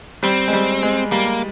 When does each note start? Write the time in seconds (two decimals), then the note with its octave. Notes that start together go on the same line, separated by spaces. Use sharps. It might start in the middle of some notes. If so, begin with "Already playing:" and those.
0.23 G3 C4
0.48 G#3
0.53 G3
0.83 G#3
1.12 G3 A#3